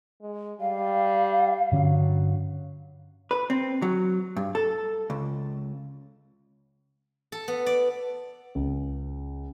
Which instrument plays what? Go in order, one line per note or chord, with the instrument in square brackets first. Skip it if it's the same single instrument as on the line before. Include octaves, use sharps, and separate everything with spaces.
[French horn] G#3
[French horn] G3 [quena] F5
[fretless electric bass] G2 D3 C#4 [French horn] F#3
[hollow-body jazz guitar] B4
C4
F#3
G2
A4
C#2
[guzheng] A4
B3
D5
[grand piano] C#2